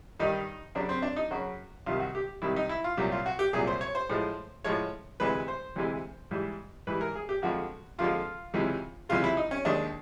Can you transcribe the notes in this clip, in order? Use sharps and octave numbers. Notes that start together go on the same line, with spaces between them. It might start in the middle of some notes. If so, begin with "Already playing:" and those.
G2 D#3 G3 D#4
F#2 C#3 F#3 D4
C4
D4
D#4
F#2 C#3 F#3 F#4
C2 C3 D#3 G3 F4
F#4
G4
C2 C3 D#3 G3 E4
D#4
E4
F4
C2 A#2 F#3 G4
F4
F#4
G4
C2 A#2 F#3 G#4
C5
C#5
C5
A2 F3 G#3
A2 F3 G#3 C#5
D2 C3 E3 G#3 B4
C5
D2 C3 E3 G#3
G#2 E3 G3
G#2 E3 G3 B4
A#4
G#4
G4
F2 D3 F3 G#3 F#4
F2 D3 F3 G#3 F4
C#2 C3 E3 G#3
C#2 C3 E3 G#3 F4
E4
D#4
C#4
D#2 D#3 G#3 D4